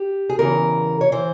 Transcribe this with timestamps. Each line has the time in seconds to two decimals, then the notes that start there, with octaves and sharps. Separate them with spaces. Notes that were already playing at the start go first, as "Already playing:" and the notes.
Already playing: G4
0.29 G#4
0.39 E2 C#3 E3 A#4
1.01 C#5
1.12 E3 C5